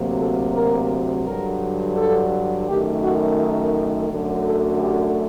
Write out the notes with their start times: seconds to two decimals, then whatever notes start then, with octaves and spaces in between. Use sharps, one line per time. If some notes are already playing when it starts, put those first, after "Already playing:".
Already playing: D2 C3 F#3 A#3
0.20 A4
0.55 A#4
1.26 G2 D3 F#3 A#4
1.97 A4
2.68 F#2 D#3 A3 G4
3.04 F#4
3.40 D#4
4.10 F#2 D3 F#3 A3
4.47 A4
4.81 G4